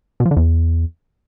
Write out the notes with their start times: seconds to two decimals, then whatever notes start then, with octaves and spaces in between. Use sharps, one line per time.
0.20 B2
0.25 F3
0.31 D3
0.37 E2